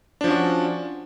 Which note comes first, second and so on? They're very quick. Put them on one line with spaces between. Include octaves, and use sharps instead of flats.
D4 F3 C#4 F#4